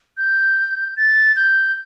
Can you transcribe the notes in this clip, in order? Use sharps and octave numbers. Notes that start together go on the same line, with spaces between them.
G6
A6
G6